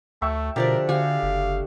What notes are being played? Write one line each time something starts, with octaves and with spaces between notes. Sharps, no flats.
D2 A3 E5 G5 C#6
B2 D3 F3 G4 A#4 D5
D3 F#4 G4 F5 G#5
F#1